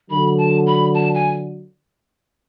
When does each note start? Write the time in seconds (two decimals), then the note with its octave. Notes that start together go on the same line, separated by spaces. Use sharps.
0.10 D3 F#3 B5
0.38 A5
0.66 B5
0.94 A5
1.14 G#5